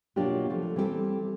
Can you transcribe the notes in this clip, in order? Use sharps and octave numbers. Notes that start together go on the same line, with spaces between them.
B2 F#3 A#3 D4 F4 G4
C3 F3 A3 A#3
E3 G3 C4 D4 G4 A4